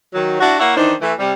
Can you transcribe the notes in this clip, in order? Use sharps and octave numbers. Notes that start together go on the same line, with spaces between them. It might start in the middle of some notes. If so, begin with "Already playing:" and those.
D#3 F#3
D4 E4 F#4
A#3 E4 C#5 E5 F#5
D#3 E3 D4 D#4 C5
E3 A3
C3 G3